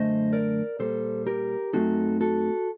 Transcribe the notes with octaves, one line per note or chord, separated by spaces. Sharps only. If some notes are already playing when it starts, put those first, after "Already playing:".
Already playing: F#2 D3 A3 C5 D#5
A#4 D5
A#2 G3 A#3 A4 C5
G4 A#4
F#2 F#3 A3 C4 D#4 F#4 A4
F#4 A4